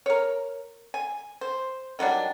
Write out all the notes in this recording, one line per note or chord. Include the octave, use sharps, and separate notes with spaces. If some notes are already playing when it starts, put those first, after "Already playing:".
A#4 C#5
G#5
C5
D#3 F#3 G3 D4